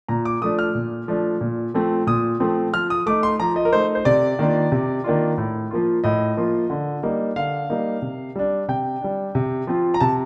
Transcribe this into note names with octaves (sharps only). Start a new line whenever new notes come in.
A#2 A#5
D6
F3 A3 D4 D#6
F6
A#2
F3 A3 D4
A#2
F3 A3 C4
A#2 D#6
F3 A3 C4
F3 F6
D#6
A3 D#4 D6
C6
F3 A#5
D#5
A#4
A3 D#4 C5
C5
C3 D5
D#3 A#3 D4 F4
C3
D#3 A#3 D4 F4
A2
F3 A#3 F4
A2 D#5
F3 A#3 F4
D3
G3 A#3 D#4
D3 F5
G3 A#3 D#4
C3
G3 D4
C3 G5
G3 D4
C3
F3 C4 F4
A#5
C3 A5